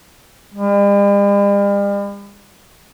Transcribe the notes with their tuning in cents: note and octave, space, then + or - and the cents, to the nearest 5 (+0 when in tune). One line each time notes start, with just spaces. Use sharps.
G3 +45